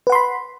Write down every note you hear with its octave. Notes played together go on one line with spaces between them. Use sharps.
B4 F#5 B5 C6